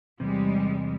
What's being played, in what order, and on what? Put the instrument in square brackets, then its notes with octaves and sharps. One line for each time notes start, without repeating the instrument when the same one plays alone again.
[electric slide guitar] E2 C3 [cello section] G3 G#3